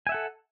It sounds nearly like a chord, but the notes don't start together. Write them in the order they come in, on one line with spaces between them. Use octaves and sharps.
G#5 E5 F#5 A4